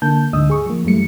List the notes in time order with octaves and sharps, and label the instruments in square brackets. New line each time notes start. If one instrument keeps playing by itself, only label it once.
[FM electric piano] D3 A#3 A5 G6
D2 G#2 D3 D#5 D#6 E6
G#4 C#6
F3 A#3
F#2 E3 G3 A3 C#7